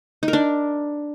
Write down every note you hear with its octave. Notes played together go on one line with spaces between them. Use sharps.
D#4
A#4
D4